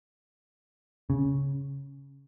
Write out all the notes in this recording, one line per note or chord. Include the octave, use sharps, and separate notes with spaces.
C#3